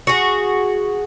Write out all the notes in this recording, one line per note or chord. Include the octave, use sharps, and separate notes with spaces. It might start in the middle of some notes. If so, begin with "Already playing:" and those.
F#4 G#4